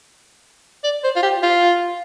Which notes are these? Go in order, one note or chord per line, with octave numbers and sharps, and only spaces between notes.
D5
C5
F4
G4
F4